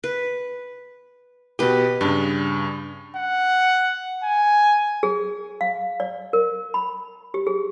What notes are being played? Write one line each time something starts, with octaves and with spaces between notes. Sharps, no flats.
B4
B2 G4 B4 D#5
G2 C#3 D4
F#5
G#5
G#4
F5
D5
A#4
B5
G4
G#4